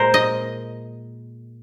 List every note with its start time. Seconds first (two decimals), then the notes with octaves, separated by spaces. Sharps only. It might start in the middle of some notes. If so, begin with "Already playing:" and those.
Already playing: A#2 G#3 A#4 C5
0.14 D#5